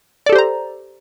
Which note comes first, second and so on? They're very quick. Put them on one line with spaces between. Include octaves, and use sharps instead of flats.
D5 A4 G4 C5 A#5